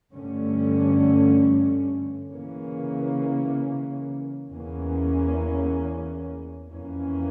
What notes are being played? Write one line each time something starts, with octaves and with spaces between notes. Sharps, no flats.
G2 D3 A3 C#4
C#3 E3 A#3 C#4
E2 E3 A#3 C#4
F2 E3 A#3 C#4